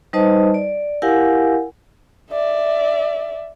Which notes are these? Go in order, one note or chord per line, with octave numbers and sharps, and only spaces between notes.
G3 D#4 B4 C5 D#5 A5
D5
E4 G4 A#4 F5 F#5 G#5
D5 E5